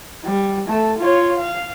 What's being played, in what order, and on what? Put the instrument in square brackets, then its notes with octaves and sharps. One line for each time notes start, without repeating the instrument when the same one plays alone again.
[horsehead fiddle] G3
A3 A4
F4 C#5
F5